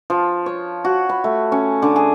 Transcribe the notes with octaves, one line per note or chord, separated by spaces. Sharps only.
F3
C#5
F#4
B5
A3
C#4
D3
G#4